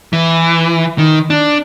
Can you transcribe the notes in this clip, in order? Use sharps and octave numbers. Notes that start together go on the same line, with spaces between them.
E3
D#3
D4